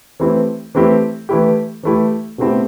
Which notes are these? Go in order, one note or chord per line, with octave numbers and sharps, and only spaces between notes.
E3 A3 C4 E4 G4
E3 A3 C4 E4 G4
E3 A3 E4 G4
E3 A3 E4 G4
B2 A3 C4 E4 G4